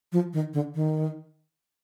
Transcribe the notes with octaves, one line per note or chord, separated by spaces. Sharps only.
F3
D#3
D3
D#3